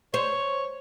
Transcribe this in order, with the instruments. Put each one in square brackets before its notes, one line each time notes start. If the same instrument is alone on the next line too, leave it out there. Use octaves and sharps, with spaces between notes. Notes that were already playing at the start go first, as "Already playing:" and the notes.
[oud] C5 [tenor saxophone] C#5